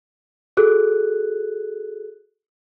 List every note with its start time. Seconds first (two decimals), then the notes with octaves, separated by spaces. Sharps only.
0.57 F#4 G#4 A4 F#6